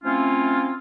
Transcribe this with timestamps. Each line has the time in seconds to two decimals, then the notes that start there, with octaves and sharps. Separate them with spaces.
0.04 F3 A3 C4 C#4 E4 F4